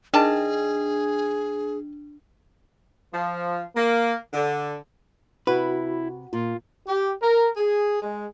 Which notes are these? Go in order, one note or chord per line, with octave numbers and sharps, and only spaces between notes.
D#3 D4 G#4 D5 A5
F3
A#3
D3
C3 E4 F#4 B4
A#2 F4
G4
A#4
G#4
G#3